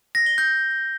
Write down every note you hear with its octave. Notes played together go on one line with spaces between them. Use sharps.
A#6
G7
G6